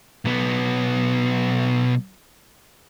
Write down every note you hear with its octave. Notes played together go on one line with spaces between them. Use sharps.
B1 B3